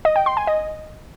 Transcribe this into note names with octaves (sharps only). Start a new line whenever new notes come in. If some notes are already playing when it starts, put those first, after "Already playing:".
D#5
G5
C6
G#5
D#5